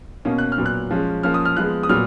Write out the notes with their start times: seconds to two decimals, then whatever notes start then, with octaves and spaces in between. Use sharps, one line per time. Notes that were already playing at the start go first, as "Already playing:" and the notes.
0.25 B2 A#3 C#4
0.38 F#6
0.52 F6
0.58 A#2 F#3 B3
0.66 F#6
0.91 F3 G#3 C#4
1.23 F3 A#3 C#4 F6
1.34 D#6
1.45 F6
1.57 F3 G#3 B3 F#6
1.83 D#6
1.89 A#2 F#3 B3 F6